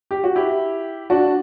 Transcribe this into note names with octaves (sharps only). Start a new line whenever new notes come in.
G4
F#4
E4 G4
D4 F#4